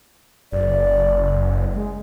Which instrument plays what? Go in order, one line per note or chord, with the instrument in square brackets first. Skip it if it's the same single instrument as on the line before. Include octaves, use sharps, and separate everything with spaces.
[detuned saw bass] F#1 [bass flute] D5
[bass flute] G#3